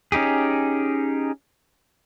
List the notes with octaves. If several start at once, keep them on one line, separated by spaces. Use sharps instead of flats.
C#4 D#4 G4 G#4